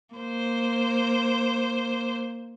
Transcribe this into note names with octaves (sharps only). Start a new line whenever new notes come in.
A#3 C5